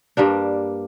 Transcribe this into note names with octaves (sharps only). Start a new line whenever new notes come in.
G2 G3 A#3 D4